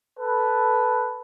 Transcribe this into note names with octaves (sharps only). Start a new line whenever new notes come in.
A4 B4